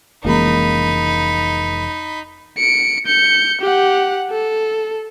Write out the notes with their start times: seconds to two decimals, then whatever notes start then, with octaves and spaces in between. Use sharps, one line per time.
0.24 F1 C#2 E3 A#3 D#4 B5
2.58 C#7 D7
3.06 G6 C#7
3.61 G4 F#5
4.30 A4